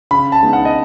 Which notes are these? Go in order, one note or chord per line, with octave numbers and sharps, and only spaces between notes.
C#3 B5
A5
G#3 B3 D#4
F#5
D#5